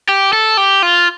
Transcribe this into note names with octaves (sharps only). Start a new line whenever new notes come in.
G4
A4
G4
F4